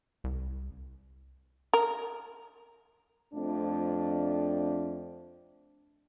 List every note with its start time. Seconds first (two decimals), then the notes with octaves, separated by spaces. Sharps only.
0.24 C2
1.74 A#4
3.34 F2 A3 D4